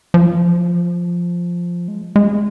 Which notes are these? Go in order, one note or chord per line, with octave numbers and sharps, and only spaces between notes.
F3
G#3
G#3